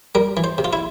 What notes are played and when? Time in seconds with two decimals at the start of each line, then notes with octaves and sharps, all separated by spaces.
0.15 G3 A#4
0.37 E3
0.44 C5
0.58 C3
0.65 F4
0.73 E4